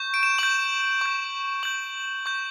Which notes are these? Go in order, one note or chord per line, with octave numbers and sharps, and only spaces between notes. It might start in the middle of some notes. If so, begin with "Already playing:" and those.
Already playing: C#6 G6
D7
E7
C#6 G6 F#7
C#6 G6
C#6 G6 F#7
C#6 G6